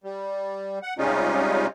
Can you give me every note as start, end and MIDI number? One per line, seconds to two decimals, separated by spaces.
0.04 0.79 55
0.83 0.94 78
0.98 1.67 48
0.98 1.67 55
0.98 1.67 56
0.98 1.67 61
0.98 1.67 63
0.98 1.67 65